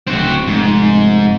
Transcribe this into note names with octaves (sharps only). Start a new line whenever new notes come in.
D1 C4 F#4
F1 G#2